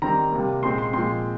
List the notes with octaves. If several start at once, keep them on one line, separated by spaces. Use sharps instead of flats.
D#3 G3 C4 A#5
C3 G3 A#3
A#2 G#3 C4 C6
C6
A#2 F3 G#3 C4 C6